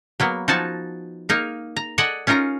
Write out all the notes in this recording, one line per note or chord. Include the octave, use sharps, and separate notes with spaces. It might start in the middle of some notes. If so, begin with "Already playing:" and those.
F#3 A#3 B3
F3 D#4 F#4 G#5 A5
A#3 D#4 F5
A#5
A4 D5 D#5 F#5 G#5
C#4 D#4 F4 A#4 A#5